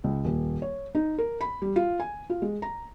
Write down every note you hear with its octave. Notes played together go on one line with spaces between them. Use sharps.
C#2
D#1
C#5
D#4
A#4
B5
G3
F4
G#5
F4
G#3
A#5